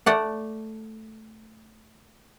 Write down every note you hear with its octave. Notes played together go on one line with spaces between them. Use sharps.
A3 D5 F#5